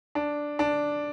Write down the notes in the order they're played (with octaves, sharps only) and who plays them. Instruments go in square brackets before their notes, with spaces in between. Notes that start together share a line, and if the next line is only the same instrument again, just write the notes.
[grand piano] D4
D4